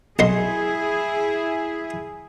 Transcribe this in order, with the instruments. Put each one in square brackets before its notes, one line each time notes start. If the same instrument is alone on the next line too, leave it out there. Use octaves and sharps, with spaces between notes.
[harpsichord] B1 D#5 C6 [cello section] E4 G#4